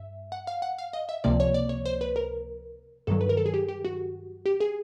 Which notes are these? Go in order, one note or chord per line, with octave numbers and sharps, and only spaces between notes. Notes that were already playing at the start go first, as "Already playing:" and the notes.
Already playing: G2 E5
F#5
F5
F#5
F5
D#5
E5
C#2 C3 F3 A#3 D5
C#5
D5
C#5
C5
B4
A#4
G2 D#3 F#3 A4
B4
A#4
A4
G#4
G4
G4
F#4
G4
G#4